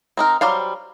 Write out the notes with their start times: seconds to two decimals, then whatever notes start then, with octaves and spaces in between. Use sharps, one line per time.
0.17 C4 D#4 A#4
0.41 F#3 G3 C5 F5